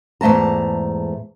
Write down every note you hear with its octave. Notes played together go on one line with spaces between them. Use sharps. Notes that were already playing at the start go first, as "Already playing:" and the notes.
E2 G#2 A3 A5 A#5